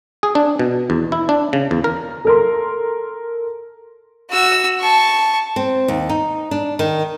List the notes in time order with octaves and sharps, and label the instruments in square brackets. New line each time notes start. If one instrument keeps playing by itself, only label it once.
[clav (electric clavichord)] G#4
D4
B2
E2
E4
D4
C#3
E2
A#4
[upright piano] A4 A#4 C6
[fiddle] F#4 E6
A5 C#6
[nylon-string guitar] C4
D#2
D#4
D4
D#3